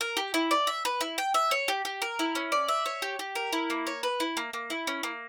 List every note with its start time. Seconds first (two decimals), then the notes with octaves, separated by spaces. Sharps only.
0.01 A#4
0.17 G4
0.34 E4
0.51 D5
0.67 E5
0.85 B4
1.01 E4
1.18 G5
1.34 E5
1.51 C#5
1.68 G4
1.85 G4
2.02 A#4
2.19 E4
2.35 C#4
2.52 D5
2.68 E5
2.86 C#5
3.02 G4
3.19 G4
3.35 A#4
3.53 E4
3.70 A#3
3.87 C#5
4.03 B4
4.20 E4
4.37 A#3
4.53 A#3
4.70 E4
4.87 C#4
5.03 A#3